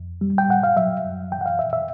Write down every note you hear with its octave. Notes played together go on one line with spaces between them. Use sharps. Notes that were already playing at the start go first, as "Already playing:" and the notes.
Already playing: F2
G3
G5
A2 F#5
F5
F#3 E5
F#2
E3 G5
F#5
F5
F2 E5
E5